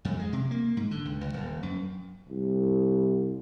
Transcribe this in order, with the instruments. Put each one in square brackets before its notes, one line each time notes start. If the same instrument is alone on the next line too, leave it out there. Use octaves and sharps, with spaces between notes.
[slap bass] F2
G#3
C3
A#3
G#2
D3
C#2
C#2
D#1
F#2
[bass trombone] C2